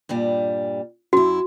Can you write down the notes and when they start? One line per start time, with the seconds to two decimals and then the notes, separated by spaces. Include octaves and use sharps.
0.09 G2 A#2 G3
1.13 F#2 E4 F#4